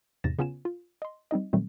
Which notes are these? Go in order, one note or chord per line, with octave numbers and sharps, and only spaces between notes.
E2 G#2 C3 A6 A#6 E7
C#3 B3 C#4 F4 G#5 E7
F4
D#5 C6
G3 C4 D#4 D#5
A#2 D#3 F#3 G3 A3 C4